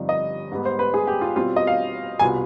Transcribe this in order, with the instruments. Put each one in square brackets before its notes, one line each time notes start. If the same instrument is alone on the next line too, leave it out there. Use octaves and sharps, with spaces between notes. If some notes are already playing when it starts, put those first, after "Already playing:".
Already playing: [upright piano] G1 G2 F3 C4 D#4
D#5
G#2 G3 B3
C5
B4
G#4
G4
F4
B2 G3 C4 F4
D#5
F5
C2 B2 B3 F4 G#5